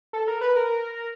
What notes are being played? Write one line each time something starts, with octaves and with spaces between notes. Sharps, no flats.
A4
A#4
B4
A#4